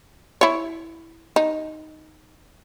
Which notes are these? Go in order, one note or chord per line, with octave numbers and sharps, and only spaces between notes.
E4 C#5
D#4